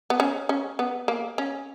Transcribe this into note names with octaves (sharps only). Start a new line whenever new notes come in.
B3
C#4
C#4
B3
A#3
C#4